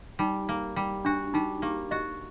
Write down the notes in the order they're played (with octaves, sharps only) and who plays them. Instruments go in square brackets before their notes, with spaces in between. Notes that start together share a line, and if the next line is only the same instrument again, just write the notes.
[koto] G3 [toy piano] D#4
[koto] A#3
G3
[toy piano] D4 [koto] F#4
[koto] G3 [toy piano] D#4
[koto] A#3 [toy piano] G4
[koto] F#4 [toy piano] D#5